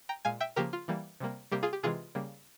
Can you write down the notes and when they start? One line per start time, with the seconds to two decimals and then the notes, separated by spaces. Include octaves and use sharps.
0.09 G5 A#5
0.25 A#2 G#3 F5 G#5
0.40 E5 G5
0.56 C#3 F3 A#3 G4 A#4
0.73 F4
0.88 E3 G3 A#3
1.20 C3 G3 A#3
1.52 C3 G3 A#3 G4
1.63 F4 G#4
1.73 G4
1.83 C3 E3 G#3 F4 G#4
2.15 C#3 G3 A#3